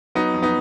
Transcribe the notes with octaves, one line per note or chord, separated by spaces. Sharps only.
F#3 B3 D#4
F2
B3 D#4